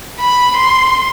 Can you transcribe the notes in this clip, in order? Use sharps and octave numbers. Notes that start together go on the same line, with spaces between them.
B5
C6